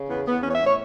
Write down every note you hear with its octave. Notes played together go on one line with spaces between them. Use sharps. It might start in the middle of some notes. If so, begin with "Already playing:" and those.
Already playing: C#3
E2 B3
E2 B3
E3 C#4
C#5
E5
A2
C#5